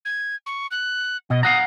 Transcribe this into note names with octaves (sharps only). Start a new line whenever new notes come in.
G#6
C#6
F#6
B2 D#5
F5 F#5 A#5 D#6